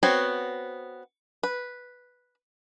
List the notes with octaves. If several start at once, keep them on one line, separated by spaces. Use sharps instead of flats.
B3 C4 F#4 C#5
B4